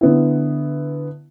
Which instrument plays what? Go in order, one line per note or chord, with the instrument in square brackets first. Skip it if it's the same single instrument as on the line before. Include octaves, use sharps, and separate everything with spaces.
[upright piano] D3 B3 E4